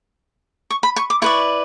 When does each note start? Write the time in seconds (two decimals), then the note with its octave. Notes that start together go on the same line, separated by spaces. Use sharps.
0.70 C#6
0.83 B5
0.96 C#6
1.10 D6
1.22 E4 B4 D5 C#6